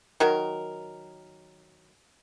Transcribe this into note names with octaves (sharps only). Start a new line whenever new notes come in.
D#3 F#3 A#4